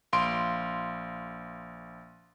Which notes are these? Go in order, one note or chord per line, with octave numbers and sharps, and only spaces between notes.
A#1 F5 C6 D7